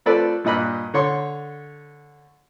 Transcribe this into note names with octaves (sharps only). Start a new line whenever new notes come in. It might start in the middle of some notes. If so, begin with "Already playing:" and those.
F3 A3 C4 A4 B4 D5
G2 A#2 D#5 B5 F#6
D3 C#5 C6